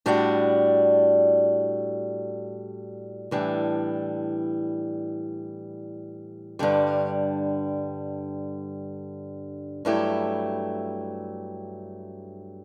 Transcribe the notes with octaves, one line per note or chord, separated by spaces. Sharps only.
A2 G3 D4 F#4
A2 E3 G3 D4
G2 D3 G3
G2 F#3 A3 E4 G4